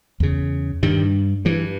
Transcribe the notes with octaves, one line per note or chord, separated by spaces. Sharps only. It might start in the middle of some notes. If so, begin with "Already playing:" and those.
E2 C#3
G2 D#3 G3
G2 E3